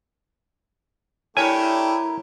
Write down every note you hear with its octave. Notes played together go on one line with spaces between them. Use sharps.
A3 D4 E4 G4 A#4 C#5 E5 G#5